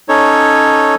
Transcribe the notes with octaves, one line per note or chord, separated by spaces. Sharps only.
C#4 D#4 A4 C#5